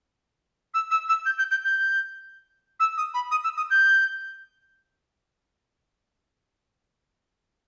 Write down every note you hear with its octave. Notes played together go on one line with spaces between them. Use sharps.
E6
E6
E6
G6
G6
G6
G6
E6
D#6
B5
D#6
E6
D#6
G6